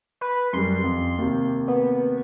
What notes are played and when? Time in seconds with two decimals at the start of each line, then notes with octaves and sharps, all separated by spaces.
0.21 B4
0.53 F#2 G3 C6
0.84 F2
1.18 D#2 C3
1.68 B3